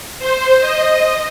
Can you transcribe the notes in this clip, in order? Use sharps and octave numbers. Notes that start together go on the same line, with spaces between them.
C5
D#5